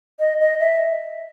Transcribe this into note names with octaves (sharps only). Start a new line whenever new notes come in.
D#5
D#5
E5